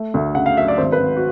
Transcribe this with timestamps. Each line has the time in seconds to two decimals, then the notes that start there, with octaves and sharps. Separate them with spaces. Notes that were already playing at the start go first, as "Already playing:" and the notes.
Already playing: A3
0.14 D2
0.35 C#3 F#5
0.46 F5
0.57 F#3 E5
0.68 D5
0.78 G#1 C5
0.92 B4
1.00 G#1
1.17 F#4